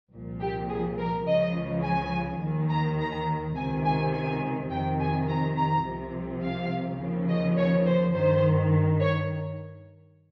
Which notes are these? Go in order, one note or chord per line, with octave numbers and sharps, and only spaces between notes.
C2 A#2 F3
G4
G#4
A#4
C#2 C#3 F3 D#5
G#5
D#2 D#3
A#5
A#5
C#2 C3 D#3 G#5
G#5
G#5
F2 C3 D#3 G5
G#5
A#5
A#5
C2 C3 F3
F5
D#2 C#3 F3
D#5
C#5
C5
G2 D#3 C5
C#5